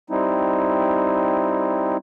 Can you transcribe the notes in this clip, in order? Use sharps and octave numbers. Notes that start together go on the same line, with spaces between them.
G3 C4 D#4 E4